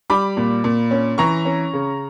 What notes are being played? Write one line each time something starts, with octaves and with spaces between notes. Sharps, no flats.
G3 B5 D6
A#2
A#2
C#4
E3 A#5 C#6
C#4
C#3